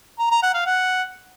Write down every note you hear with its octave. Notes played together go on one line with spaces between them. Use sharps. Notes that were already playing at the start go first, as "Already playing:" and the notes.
A#5
A#5
F#5
F5
F#5